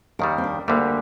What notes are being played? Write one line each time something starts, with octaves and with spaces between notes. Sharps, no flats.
D#2 D#3 G3 A#4
C4
D4
D2 D3 G3 A#3